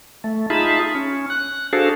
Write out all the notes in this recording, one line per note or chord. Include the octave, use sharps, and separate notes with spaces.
A3
D#4 F4 G#4 E5 A5 B5
C#4
F#6
D4 F#4 G#4 A4 C5 F5